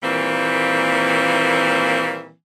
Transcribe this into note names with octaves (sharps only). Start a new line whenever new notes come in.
A#2 D#3 E3 G3 A#3 C4